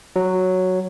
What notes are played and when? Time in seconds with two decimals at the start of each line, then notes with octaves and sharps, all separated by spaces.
0.16 F#3